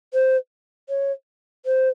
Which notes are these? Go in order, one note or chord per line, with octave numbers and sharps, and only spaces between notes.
C5
C#5
C5